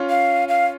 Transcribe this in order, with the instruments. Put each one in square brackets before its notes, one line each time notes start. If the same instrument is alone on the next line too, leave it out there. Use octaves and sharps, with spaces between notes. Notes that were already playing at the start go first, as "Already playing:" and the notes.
Already playing: [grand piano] C#4 F4
[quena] F5
F5